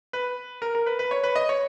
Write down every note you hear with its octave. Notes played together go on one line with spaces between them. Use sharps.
B4
A#4
A#4
B4
B4
C#5
B4
D#5
C#5